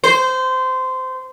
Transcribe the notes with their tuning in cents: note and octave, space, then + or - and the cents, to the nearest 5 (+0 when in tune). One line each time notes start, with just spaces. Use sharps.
C5 -20